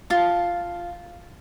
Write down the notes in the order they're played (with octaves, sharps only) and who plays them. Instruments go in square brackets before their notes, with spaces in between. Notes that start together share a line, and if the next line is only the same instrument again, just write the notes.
[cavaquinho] F4 A5